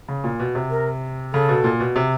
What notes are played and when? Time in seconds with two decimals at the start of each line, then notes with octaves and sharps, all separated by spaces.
0.08 C#3
0.24 A#2
0.40 B2
0.55 C3
0.70 A#4
1.33 C#3 A4
1.49 B2
1.64 A#2
1.80 B2
1.96 C3